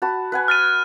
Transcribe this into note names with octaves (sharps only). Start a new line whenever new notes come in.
F#4 A5 B5
B4 F#5 G#5
F6 A6 D#7